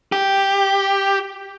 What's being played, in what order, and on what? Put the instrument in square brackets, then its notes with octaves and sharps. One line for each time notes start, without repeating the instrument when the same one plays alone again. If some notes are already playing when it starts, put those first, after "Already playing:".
[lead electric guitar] G4